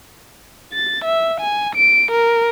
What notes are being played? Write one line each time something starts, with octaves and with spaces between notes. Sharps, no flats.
A6
E5
G#5
D7
A#4